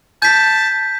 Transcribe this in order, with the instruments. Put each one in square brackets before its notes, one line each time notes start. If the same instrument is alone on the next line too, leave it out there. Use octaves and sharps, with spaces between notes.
[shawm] A5 [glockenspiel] G6 B6